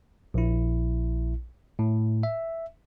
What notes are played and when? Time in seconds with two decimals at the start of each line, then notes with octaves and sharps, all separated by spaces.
0.34 A#1 E4
1.79 A2
2.23 E5